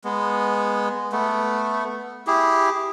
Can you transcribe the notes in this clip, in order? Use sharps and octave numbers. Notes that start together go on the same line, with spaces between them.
G#3 B3
A3 B3
E4 G4 G#4